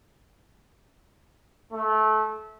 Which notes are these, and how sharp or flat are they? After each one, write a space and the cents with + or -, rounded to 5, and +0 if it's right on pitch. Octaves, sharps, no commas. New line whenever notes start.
A3 -25